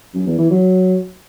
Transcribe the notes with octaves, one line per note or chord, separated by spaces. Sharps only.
F#2
E2
E3
F#3